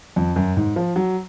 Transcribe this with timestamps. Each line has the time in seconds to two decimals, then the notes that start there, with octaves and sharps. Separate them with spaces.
0.16 F2
0.36 F#2
0.57 G#2
0.76 F3
0.96 F#3